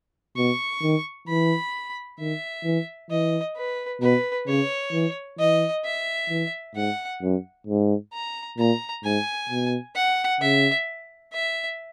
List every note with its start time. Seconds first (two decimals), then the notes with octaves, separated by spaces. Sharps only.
0.37 B2 C#6
0.82 D#3
1.28 E3 B5
2.19 D#3 E5
2.65 E3
3.11 E3 D#5
3.56 B4
4.02 B2 B4
4.47 C#3 C#5
4.93 E3
5.39 E3 D#5
5.84 E5
6.30 E3
6.75 G#2 F#5
7.22 F#2
7.67 G#2
8.13 A#5
8.58 A#2 A#5
9.04 G#2 G#5
9.49 B2
9.96 F#5
10.41 C#3 E5
11.33 E5